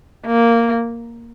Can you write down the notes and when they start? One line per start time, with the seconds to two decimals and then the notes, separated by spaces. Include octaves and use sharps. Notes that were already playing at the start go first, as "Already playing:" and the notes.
0.27 A#3